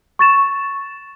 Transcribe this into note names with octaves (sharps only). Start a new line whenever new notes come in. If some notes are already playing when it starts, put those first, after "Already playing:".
C#6 A6 E7